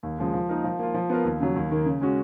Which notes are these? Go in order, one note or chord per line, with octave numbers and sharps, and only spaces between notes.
D#2
C#3 F3 G#3
F3
A#3 D#4 A#4
F3
A#3 F4
F3
B3 F4 A#4
D#2
C#3 F#3
D#2
D#3 A#3
C#3
G#3 C#4 F#4